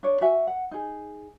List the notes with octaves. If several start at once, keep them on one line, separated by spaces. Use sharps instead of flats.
D4 C#5
F#4 E5 G#5
F#5
D#4 G#4